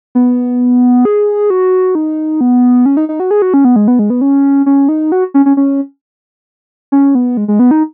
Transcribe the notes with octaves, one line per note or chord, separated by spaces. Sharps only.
B3
G#4
F#4
D#4
B3
C#4
D#4
D#4
F#4
G#4
F#4
C#4
B3
G#3
B3
G#3
B3
C#4
C#4
D#4
F#4
C#4
C#4
C#4
C#4
B3
G#3
G#3
B3
D#4